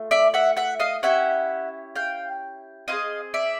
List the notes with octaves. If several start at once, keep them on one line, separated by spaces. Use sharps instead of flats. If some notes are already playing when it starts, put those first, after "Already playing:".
Already playing: A3 F4
D5 E5
E5 F#5
E5 F#5
D#5 F5
C#4 E4 G4 E5 F#5
F5 G5
C4 E4 G#4 D#5 F5
D5 E5